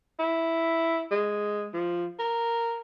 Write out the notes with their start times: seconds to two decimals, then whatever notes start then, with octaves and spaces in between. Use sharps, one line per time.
0.19 E4
1.11 G#3
1.73 F3
2.19 A#4